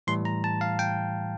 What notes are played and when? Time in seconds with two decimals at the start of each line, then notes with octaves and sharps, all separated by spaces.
0.07 A2 E3 G3 C6
0.25 A#5
0.44 A5
0.61 F5
0.79 G5